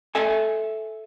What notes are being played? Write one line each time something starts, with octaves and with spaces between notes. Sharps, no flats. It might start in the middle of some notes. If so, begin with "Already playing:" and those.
A4 E5 G#5